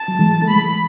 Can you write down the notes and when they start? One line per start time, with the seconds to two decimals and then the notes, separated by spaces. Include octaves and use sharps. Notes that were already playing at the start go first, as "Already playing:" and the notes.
Already playing: A5
0.08 F#3
0.19 E3 G#3
0.42 A3
0.48 E3 G#3 B5